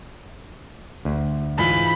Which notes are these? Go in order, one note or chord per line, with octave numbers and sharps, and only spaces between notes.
D2
G#2 E3 F4 B5